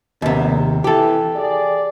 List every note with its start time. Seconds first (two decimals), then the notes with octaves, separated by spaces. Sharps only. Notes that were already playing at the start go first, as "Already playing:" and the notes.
0.22 A#1 D#2 C3 B3
0.84 E3 G4 A4
1.37 G#4 D5